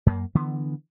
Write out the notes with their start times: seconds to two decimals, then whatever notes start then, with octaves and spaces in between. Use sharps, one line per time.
0.06 F#2 A#3
0.35 D3 E3 B3